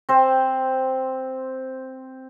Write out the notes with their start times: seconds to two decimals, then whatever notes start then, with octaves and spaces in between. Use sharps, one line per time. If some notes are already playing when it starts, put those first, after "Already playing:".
0.09 C4 C5